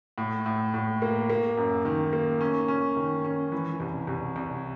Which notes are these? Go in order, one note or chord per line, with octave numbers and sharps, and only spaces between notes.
A2
A2
A2
A#3
A#3
F#2
D#3
A#3
C#4
C#4
D#3
C#4
E3
C2
C2
C2